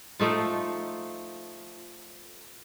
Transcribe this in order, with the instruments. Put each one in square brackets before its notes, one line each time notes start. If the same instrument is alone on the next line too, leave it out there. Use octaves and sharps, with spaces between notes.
[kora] F3 A3 D#4 F4